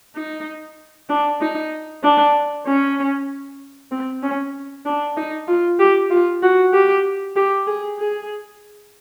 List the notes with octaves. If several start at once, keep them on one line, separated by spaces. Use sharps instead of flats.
D#4
D4
D#4
D4
C#4
C4
C#4
D4
D#4
F4
G4
F4
F#4
G4
G4
G#4
G#4